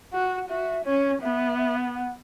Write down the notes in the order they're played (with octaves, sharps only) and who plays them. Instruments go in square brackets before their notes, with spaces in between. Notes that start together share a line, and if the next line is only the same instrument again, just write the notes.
[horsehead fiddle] F#4 [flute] F#5
[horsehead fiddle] F#4 [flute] E5
[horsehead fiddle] C#4 [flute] C#5
[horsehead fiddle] B3 [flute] E5
[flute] E5
F#5
F#5